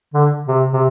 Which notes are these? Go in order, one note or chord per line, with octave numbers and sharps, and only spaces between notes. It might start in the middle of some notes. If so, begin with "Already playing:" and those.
D3
C3
C3